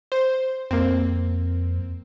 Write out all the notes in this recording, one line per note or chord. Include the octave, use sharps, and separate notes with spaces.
C5
F2 A#3 C4